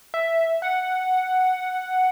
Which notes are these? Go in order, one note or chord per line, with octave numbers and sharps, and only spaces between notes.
E5
F#5